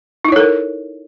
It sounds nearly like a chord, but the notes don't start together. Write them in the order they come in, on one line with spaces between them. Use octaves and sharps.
D#4 E4 C#5 A4 A#4